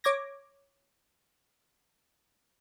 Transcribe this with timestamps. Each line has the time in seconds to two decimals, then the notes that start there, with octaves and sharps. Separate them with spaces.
0.04 C#5 D6 G#6 A#6